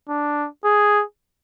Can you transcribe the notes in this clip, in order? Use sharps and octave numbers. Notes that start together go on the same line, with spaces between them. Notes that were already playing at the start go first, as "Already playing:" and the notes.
D4
G#4